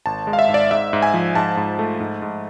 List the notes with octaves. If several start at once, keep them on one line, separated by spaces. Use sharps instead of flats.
G#1 A5
G#3
F5
E5
G#2
D5
G#2 E5
G#2
G#5
F3
G#2 A5
G#2
A3
G#2
G#2